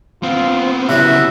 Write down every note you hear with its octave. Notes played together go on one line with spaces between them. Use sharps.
B3 C4 F4
C#3 F#3 G3 B3 E4 F#4 E5